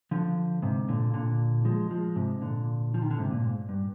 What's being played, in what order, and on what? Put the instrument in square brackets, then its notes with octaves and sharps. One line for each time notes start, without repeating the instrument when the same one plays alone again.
[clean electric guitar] D3 F3
G#2 C3
A#2 D3
A#2 D3
F3 G#3
F3 G#3
G#2 C3
A#2 D3
F3
D#3
D3
G#2 C3
A#2
G#2
G2